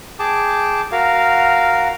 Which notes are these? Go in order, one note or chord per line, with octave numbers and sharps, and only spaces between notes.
G#4 G5 A5 D6
F#4 A#4 F5